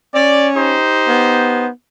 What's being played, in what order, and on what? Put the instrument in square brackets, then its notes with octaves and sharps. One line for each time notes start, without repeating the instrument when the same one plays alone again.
[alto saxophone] C#4 [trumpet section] D5
[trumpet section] D#4 G4 C5
[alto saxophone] B3